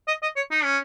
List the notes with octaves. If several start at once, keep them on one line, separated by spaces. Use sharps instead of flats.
D#5
D#5
C#5
D#4
C#4